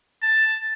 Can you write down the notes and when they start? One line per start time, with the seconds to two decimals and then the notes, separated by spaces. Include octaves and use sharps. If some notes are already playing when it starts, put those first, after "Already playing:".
0.22 A5